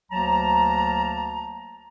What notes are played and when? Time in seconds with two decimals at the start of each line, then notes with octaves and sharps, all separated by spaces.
0.12 D2 F#3 A#3 A5 A#5